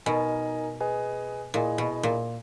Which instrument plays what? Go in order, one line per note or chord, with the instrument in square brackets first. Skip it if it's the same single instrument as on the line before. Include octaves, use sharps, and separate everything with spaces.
[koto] B2 [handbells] D#4 A#4 D#5 G#5
[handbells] G#4 B4 D#5 G#5
[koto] A#2 [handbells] E4 G#4 D#5 G#5
[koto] B2
A#2